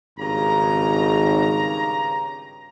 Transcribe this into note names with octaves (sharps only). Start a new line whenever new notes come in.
G#1 G2 C#3 A#5